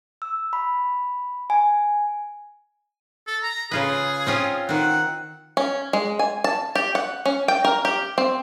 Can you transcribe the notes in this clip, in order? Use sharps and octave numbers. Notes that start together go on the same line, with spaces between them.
E6
B5
G#5
A4
A#5
C#3 F4 G#4 B4
C4 C#4 F4
D#3 C4 F#5
C#4
G#3
G#5
A5
G4
F#5
C#4
G5
A#4
G4
C4